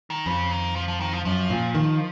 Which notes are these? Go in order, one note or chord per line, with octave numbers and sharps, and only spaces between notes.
D#3
F2 C#3
D#3
F3
F3
D#3
F3
F#2 F3
A#2
D#3